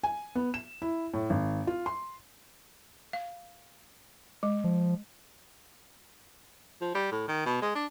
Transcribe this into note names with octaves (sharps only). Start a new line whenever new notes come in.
G#5
B3
E7
E4
A2
G#1
F4
C6
F5
G#3
F3
F3
G3
A2
D#3
B2
G#3
D4